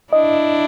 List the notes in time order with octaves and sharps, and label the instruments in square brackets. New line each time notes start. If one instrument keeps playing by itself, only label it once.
[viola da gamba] D4 E4 [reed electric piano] D#5